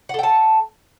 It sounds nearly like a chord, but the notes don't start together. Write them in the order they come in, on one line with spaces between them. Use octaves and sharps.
F#5 A4 G5 A5